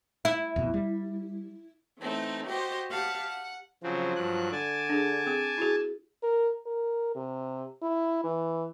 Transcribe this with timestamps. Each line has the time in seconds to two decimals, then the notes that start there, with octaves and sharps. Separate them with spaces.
0.25 E4
0.56 D1 F2 B2
0.74 G3
1.99 E3 A3 C4 D#4
2.46 F#4 G4 C5 D#5
2.90 G4 F5 F#5 A5
3.26 F#5
3.83 C#3 F3 F#3 C4
4.15 G2 F#3 F#6
4.52 D3 G#5 A5 D6
4.89 D4 G#4
5.26 C4 G#4
5.58 E4 F#4 G#4
6.23 A#4
6.66 A#4
7.15 C3
7.82 E4
8.24 E3